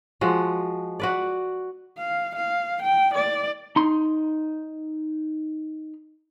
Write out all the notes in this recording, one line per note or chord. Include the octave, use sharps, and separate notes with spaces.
F3 G#3 F#4
F#4 B4 D5
F5
F5
G5
D5
D#4 C6